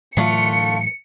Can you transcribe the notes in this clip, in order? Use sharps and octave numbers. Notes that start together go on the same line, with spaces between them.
A2 D3 E3 F#3 A3 F4 C#7